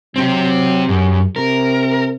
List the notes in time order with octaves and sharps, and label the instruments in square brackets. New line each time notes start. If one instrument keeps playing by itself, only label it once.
[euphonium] F#3 [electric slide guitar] C4 G4
[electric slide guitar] F#2 [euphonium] G4
[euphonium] C3 [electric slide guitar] A#4